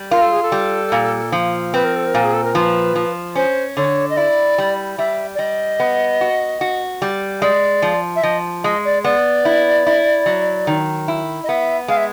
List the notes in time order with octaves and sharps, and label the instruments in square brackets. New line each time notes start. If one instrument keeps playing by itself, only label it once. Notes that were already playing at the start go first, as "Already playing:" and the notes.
Already playing: [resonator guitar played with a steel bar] G3
[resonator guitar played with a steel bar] F4 [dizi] A#4
[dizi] A4
G#4
A4
[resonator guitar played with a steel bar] G3
A#2
F3
[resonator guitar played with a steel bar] C4 [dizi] B4
[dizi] A#4
A4
A#4
[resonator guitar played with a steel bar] A#2
[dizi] G#4
A4
A#4
[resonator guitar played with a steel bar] F3 [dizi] B4
[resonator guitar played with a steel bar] F3
[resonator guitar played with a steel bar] C#4 [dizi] C5
[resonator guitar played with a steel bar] D3 [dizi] C#5
[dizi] D#5
[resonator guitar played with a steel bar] E4 [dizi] D5
[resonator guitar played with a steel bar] G3
[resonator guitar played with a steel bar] G3 [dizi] E5
[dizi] D5
[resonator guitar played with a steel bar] G3 [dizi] D#5
[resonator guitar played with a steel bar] B3
F#4
F#4
G3
[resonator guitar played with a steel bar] G#3 [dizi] D5
[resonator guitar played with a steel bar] F3
[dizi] E5
[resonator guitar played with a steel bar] F3 [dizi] D#5
[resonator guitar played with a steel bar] G#3 [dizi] D#5
[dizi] D5
[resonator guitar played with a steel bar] B3 [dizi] D5
[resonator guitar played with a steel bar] E4
E4
F#3
D#3
E4
[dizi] D#5
[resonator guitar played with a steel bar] B3 [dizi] E5
[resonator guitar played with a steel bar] G#3 [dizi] F5
[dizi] E5